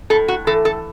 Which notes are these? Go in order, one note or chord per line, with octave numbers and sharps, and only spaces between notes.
A2 A4
F#4
E3 A4
A4